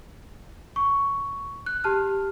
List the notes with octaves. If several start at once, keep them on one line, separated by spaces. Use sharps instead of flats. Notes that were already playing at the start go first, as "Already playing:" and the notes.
D1 C#6
F#6
G4 A5 F6